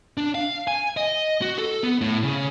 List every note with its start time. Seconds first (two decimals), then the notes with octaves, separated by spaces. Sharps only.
0.17 D4
0.35 F5
0.67 G#5
0.97 D#5
1.42 F#4
1.58 A4
1.83 B3
2.01 A2
2.23 C#3